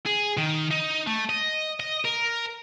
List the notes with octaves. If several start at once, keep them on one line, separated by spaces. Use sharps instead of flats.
G#4
D#3
D#4
A3
D#5
D#5
A#4